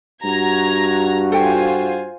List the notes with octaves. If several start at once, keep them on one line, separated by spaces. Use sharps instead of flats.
G2 F#4 A#5 G#6
F4 A4 C5 G5 G#5